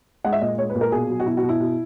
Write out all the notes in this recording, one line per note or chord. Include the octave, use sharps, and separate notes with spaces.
G#3 F#5
E5
A#2 D#5
G#3 C#5
B4
A#2
A#4
B2 G#4
F#3
F#4
B2 E4
F#4
B2
E4
B2